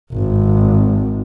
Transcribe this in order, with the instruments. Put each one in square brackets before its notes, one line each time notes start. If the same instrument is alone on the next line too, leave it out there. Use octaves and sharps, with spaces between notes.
[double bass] G#1